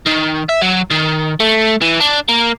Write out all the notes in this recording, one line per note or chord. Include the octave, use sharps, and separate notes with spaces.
D#3
E5
F#3
D#3
A3
E3
D4
A#3